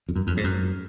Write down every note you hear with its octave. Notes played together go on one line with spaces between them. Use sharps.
F2
F#2
F2
G#2
F#2